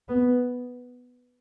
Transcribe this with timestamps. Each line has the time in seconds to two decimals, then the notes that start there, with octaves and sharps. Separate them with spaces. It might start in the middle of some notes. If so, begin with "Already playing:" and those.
0.09 B3